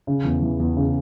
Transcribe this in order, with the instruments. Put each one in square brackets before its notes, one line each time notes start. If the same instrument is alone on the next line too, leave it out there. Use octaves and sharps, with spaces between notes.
[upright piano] C#3
E2
E3
E2
C#3